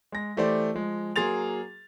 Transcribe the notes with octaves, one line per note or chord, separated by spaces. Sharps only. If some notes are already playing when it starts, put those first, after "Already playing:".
G#3 A#6
E3 A3 G4 C5 D5
F3 G#3
F#3 A#3 G#4 C6 A6 F7